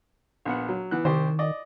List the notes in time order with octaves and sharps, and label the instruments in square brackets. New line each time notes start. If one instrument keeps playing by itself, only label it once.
[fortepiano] A#1 B3 F#5
F#3
E3 B3 F#6
[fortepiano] C2 G4 C5 [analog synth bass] D#3
[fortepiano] D5 D#5